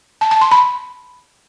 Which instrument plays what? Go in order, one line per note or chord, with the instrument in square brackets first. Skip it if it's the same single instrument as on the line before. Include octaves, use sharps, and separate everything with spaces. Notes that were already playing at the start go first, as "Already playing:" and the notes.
[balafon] A5
A5
C6
B5